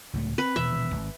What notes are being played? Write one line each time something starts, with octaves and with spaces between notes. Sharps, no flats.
C#2 A2 A3
C4 B4
D#1 B2 E3 E5
G#1